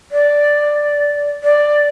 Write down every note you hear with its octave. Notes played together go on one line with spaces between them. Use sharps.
D5
D5